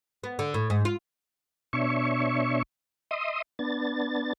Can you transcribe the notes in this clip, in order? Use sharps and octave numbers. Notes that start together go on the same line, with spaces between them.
B3
D3
A2
G#2
F4
B2 D4 C#5 E5 C#6
D#5 E5 C6 D#6
B3 D4 A6